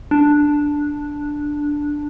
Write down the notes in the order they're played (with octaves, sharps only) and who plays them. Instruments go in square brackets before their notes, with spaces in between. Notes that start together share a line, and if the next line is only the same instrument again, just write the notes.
[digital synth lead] D4